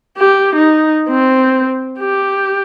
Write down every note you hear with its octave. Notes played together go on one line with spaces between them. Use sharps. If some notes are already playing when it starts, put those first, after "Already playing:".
G4
D#4
C4
G4